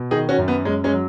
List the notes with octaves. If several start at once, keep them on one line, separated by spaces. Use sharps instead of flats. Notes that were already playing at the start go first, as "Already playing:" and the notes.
Already playing: B2
D#3 D#4 G#4
C#4 F#4
F#2
B3
F#2 G#3 C#4
G#3 C#4
F#3